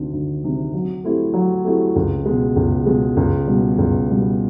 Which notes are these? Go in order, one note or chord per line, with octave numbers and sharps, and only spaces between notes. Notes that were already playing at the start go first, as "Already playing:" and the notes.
Already playing: D2 C3 D#3
D2
C3 D#3
F#3
A3 C4 E4 G4
F#3
A3 C4 E4 G4
C#2
B2 G#3
C#2
B2 G#3
C#2
B2 G3
C#2
B2 G3